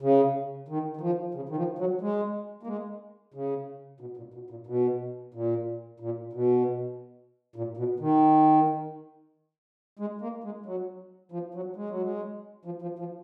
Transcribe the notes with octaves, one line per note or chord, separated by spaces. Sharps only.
C#3
D#3
D#3
F3
C#3
D#3
F3
F#3
G#3
A#3
G#3
C#3
B2
A#2
B2
A#2
B2
A#2
A#2
B2
A#2
B2
D#3
G#3
A#3
G#3
F#3
F3
F#3
G#3
F#3
G#3
F3
F3
F3